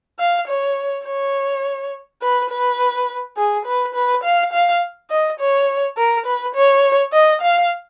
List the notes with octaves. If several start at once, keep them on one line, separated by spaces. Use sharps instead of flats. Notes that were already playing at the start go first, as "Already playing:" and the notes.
F5
C#5
C#5
B4
B4
G#4
B4
B4
F5
F5
D#5
C#5
A#4
B4
C#5
D#5
F5